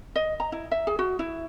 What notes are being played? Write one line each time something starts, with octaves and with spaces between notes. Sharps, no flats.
D#5
A#5
E4
E5
G#4
F#4
E4